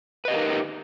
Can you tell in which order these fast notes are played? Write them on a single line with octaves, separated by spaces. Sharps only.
B4 D#5 G4 A#4 D#4